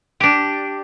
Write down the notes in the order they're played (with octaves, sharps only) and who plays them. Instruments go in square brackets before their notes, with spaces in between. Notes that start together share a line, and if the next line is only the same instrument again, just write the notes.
[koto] D4 G4